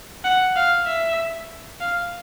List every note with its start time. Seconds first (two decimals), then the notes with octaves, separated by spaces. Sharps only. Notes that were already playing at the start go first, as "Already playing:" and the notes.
0.25 F#5
0.56 F5
0.87 E5
1.81 F5